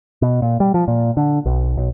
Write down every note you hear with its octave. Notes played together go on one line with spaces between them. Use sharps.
B2
A#2
G3
F3
A#2
D3
B1
B1